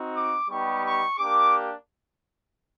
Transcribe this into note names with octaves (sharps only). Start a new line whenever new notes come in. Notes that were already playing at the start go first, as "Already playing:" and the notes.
Already playing: C4 D#4 F#4
D6
G3 B3 D#4 G4 C#6
C#6
A#3 D4 G4 D6